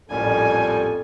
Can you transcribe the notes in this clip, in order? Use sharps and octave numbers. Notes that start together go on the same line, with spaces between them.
A1 F2 A#2 G3 C#4 A4 G#5